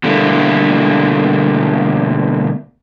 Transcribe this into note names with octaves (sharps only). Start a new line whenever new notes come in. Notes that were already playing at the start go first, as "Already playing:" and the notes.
B2 D3 G3 A3 A#3 E4